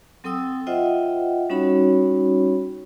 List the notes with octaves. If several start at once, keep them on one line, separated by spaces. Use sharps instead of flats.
F#3 C4 A4 G5 D#6 E6
F4 C5 D#5 E5 F#5 G5
G3 C#4 D#4 F#4 C#5 B5